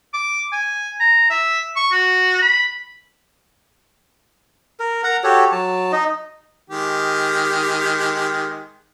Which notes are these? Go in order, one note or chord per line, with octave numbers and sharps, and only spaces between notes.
D6
G#5
A#5
E5
C#6
F#4
B5
A#4
A#4 F#5 A#5
F#4 G4 A4 C#5
F#3 A5
D#4 D#5
D#3 G#3 G4